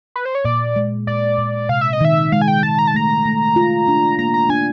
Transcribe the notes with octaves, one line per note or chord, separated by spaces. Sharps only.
B4
C5
C#5
A#2 D5
G#3
A#2 D5
A#2
C3 F5
E5
D#5
D#3 E5
G#3 F5
G#5
G5
G#3 A5
A#5
A5
A3 A#5
A3
F4
D4
A#3 A#5
A#5
D4 G#5